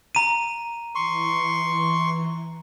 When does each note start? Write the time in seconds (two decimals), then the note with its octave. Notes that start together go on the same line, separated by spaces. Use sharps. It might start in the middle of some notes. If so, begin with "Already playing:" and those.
0.15 A#5 D#7
0.95 E3 C6 C#6